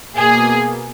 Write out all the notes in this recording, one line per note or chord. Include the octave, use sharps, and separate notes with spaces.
B2 A#3 G#4